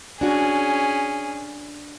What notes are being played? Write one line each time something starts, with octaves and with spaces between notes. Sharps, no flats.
C#4 D4 F#4 G#4